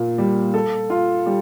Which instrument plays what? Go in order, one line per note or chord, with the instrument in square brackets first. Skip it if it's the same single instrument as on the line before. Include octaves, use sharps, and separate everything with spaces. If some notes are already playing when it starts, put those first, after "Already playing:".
Already playing: [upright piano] A#2 A#3
G3
A4
F4
G3